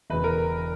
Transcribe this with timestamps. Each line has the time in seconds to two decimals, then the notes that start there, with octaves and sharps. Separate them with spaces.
0.10 E1 E2 C#3 B4
0.24 A#4